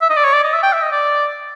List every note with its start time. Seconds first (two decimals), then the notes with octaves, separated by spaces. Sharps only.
0.02 E5
0.10 D#5
0.17 D5
0.25 C#5
0.34 D5
0.43 D#5
0.53 E5
0.63 G5
0.73 E5
0.82 D#5
0.92 D5